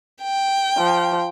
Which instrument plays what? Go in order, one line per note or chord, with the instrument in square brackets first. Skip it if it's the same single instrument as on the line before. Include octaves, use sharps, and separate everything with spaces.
[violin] G5
[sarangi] F3